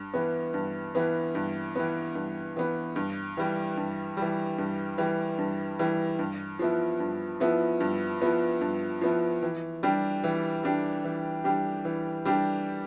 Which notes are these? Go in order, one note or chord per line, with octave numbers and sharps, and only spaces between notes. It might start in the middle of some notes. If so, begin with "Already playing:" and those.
Already playing: G2
E3 B3
G2
E3 B3
G2
E3 B3
G2
E3 B3
G2
E3 G3
G2
E3 G3
G2
E3 G3
G2
E3 G3
G2
F3 B3 E4
G2
F3 B3 E4
G2
F3 B3 E4
G2
F3 B3 E4
E3
G3 D4 G4
E3
G3 D4 G4
E3
G3 D4 G4
E3
G3 D4 G4